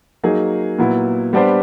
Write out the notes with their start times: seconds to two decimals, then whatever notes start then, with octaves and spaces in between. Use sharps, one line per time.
0.24 F#3 A#3 D#4 G#4
0.78 A#2 F#3 B3 E4
1.33 G3 B3 D4 G4 C5